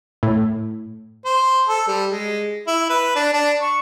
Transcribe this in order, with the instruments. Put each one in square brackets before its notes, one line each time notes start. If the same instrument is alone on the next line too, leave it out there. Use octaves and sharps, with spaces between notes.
[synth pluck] A2
[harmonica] C5
A4
G3
G#3
E4
B4
D4
D4
C#6